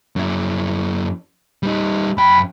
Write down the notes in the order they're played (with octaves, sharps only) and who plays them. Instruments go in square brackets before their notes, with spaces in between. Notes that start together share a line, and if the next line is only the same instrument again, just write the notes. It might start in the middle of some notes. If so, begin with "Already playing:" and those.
[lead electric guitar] F#2 E4
G3 D#4
[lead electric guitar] F#2 G5 [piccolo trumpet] B5